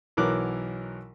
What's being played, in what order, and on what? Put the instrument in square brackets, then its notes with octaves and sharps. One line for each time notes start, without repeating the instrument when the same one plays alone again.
[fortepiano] B1 E3 F#3 A#4 D6 F#6